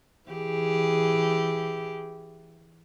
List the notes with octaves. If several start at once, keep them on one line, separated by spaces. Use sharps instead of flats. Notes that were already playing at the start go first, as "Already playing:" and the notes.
E3 G4 G#4